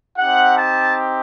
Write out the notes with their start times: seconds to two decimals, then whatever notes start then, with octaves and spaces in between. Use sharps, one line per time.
0.16 C4 D#4 G4 F#5
0.58 A5